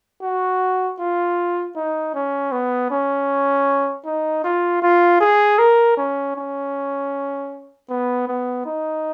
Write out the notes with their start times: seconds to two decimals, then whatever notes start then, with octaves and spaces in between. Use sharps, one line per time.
0.22 F#4
0.99 F4
1.76 D#4
2.14 C#4
2.52 B3
2.91 C#4
4.06 D#4
4.44 F4
4.82 F4
5.21 G#4
5.59 A#4
5.97 C#4
6.36 C#4
7.89 B3
8.28 B3
8.66 D#4